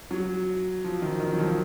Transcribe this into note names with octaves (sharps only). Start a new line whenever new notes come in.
F#3
F3
D#3
D#3
F#3
F3